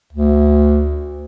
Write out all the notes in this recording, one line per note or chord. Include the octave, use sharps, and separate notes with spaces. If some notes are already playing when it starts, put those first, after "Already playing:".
D2